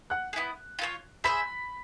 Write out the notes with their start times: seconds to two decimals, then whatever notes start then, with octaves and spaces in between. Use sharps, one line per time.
0.10 F#5 F#6
0.33 G#4
0.36 B3 E4
0.79 F4 A4 C#5
1.24 G#4 C5 E5 B5 B6